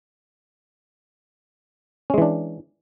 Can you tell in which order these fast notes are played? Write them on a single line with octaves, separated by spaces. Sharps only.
C#4 G#3 E3 D4